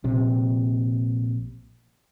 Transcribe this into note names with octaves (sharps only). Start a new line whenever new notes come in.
A#1 C3